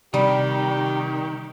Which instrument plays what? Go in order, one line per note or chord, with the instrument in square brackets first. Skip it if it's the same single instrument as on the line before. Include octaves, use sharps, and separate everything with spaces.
[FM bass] C3 [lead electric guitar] D#3 [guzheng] G3 [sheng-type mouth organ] G4